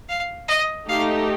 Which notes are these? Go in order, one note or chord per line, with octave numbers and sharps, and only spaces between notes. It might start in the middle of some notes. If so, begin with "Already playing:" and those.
F5
D#5
A3 D#4 G4 F5